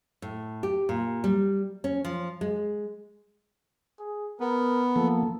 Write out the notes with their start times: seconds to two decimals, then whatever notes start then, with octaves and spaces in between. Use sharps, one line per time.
0.22 A2
0.63 G4
0.89 A#2
1.24 G3
1.84 C#4
2.05 F3
2.41 G#3
3.99 G#4
4.40 B3 A#4
4.96 F3 A#3 A4